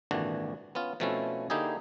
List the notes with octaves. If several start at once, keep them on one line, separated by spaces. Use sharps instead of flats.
G#1 A#2 D3 E3 D4 F#4
B3 C#4 F4
B2 F3 A3 C4 C#4 E4
D3 A#3 D#4 E4 G4 G#4